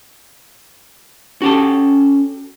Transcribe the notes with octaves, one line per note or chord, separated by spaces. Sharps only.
C#4 F#4 G4 A4